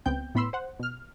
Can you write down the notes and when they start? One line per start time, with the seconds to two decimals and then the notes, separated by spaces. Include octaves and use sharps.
0.06 C#2 B3 C4 G5 G6
0.35 A2 B3 B5 C6 E6
0.53 C5 F#5
0.79 B2 F6